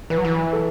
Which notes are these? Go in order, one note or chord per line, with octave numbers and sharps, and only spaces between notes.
E3 B4
F#3
E3
A4